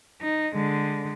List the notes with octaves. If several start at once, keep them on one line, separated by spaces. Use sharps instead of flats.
D#4
D3 G#3